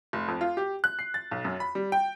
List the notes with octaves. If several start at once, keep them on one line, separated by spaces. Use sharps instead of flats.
F1
F2
F4
G4
F#6
C7
A6
B1
F#2
B5
G3
G5